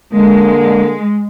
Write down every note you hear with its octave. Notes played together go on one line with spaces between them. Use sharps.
D3 G#3 A#3